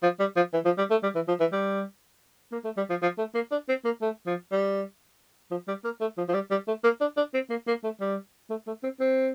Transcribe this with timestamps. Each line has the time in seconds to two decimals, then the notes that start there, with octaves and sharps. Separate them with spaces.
0.03 F3
0.20 G3
0.36 F3
0.53 E3
0.65 F3
0.78 G3
0.91 A3
1.03 G3
1.15 E3
1.28 F3
1.40 E3
1.52 G3
2.52 A#3
2.65 A3
2.77 G3
2.90 F3
3.02 F3
3.19 A3
3.35 A#3
3.51 D4
3.69 C4
3.85 A#3
4.02 A3
4.27 F3
4.52 G3
5.51 F3
5.68 G3
5.84 A#3
6.01 A3
6.18 F3
6.29 F3
6.34 G3
6.51 G3
6.68 A3
6.84 A#3
7.01 D4
7.17 D4
7.34 C4
7.50 A#3
7.68 A#3
7.84 A3
8.00 G3
8.50 A3
8.67 A3
8.83 C4
9.00 C4